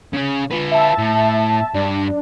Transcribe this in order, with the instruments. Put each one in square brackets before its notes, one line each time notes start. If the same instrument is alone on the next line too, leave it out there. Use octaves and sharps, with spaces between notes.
[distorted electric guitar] C#3 C#4
F4 B4
[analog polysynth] E5 A5
[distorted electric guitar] A2
[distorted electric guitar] G2 [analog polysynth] D4